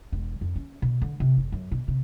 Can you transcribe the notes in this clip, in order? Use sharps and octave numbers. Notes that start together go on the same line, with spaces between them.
E1
F2
C#4
B2
D3
C3
F#1
F#2
B2
C3